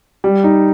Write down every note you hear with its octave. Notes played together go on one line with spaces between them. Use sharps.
G3
D#4